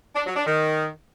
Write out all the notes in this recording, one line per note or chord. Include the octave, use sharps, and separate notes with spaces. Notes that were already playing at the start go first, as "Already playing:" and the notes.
D4
F#3
D4
D#3